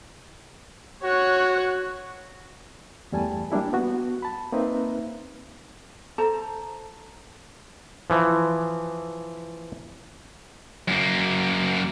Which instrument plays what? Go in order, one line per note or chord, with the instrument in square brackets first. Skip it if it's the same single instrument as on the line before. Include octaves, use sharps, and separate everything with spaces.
[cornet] F#4 [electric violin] C#5 F#6
[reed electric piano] E2 G2 G3 A3 G#5 A5
G3 A#3 D4 E4 G4
B3 F#4
A5 B5
A#3 C4 D#4 B4 E5
[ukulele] A4 C5 A5 A#5
[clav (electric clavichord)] E3 F3
[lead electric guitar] F#2 A#3